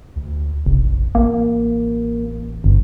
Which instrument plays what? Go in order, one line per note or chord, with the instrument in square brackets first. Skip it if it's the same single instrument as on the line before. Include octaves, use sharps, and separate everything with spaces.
[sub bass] D2
[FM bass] F1 [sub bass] A#1
[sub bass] A1 [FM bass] A#3
[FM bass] G1 [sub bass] G2